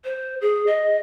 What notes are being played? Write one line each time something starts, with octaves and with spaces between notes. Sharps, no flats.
C5
G#4
D#5